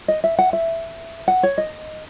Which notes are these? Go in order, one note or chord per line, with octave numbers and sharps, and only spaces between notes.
D#5
E5
F#5
E5
F#5
C#5
D#5